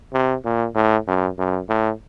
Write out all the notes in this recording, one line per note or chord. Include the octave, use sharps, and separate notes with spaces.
C3
A#2
A2
F#2
F#2
A2